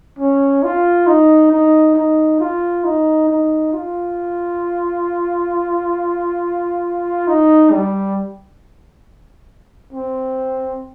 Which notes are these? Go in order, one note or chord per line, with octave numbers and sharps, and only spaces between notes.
C#4
F4
D#4
D#4
D#4
F4
D#4
D#4
F4
D#4
G3
C4